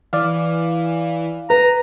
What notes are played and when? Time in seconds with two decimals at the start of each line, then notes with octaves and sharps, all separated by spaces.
0.13 E3 D5 F5
1.50 B4 A#5